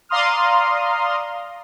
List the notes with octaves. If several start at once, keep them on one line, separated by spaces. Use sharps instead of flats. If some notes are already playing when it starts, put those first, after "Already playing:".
D5 F5 A#5 C6 D#6 F6